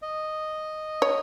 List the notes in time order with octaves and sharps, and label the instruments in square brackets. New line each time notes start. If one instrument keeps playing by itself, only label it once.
[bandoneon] D#5
[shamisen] C#5